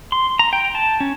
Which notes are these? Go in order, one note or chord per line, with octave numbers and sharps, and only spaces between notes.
C6
A#5
G5
A5
C#4